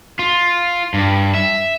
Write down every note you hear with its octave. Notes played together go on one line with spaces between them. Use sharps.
F4
G2
E5